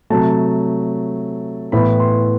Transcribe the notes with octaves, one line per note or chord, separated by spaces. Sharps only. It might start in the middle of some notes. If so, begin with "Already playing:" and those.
C3 F#3 A3 A5
A2 E3 B3 E4 B5
C6